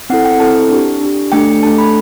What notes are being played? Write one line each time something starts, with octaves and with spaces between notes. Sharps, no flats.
C4 E4 A4 F#5
G5
C4 E4 A4 A5
D4 G4
D4 G4
A3 D4 A4 G5
A3 D4 A4 A5
B5